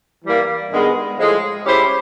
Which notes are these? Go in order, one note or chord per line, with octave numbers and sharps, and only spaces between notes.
E3 G3 A#3
G2 D#3 G#3 B3
A2 F3 G#3
G#3 C#4 E4 G4 C5